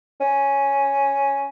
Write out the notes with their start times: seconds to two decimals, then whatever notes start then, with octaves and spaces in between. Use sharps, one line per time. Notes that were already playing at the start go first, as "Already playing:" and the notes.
0.21 C#4